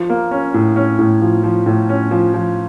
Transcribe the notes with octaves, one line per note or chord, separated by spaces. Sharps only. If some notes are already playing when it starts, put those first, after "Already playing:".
Already playing: F3
A#3
C#4
A2
C#4
A2
F3
F3
A2
C#4
F3
F3